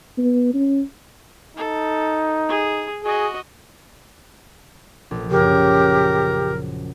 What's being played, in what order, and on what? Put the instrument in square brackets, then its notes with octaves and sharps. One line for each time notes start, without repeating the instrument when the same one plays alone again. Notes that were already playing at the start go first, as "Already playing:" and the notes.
[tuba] B3
C#4
[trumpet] D#4 [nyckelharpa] A4
[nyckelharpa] G#4
[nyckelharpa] F#4 D#5 [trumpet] G#4
[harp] A#1
[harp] F#2 C#3 [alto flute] G4 [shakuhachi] A#4